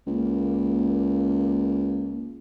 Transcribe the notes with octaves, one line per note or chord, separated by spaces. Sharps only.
C#2 A#3